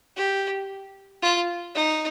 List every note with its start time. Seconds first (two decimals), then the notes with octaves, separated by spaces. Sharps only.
0.16 G4
1.22 F4
1.75 D#4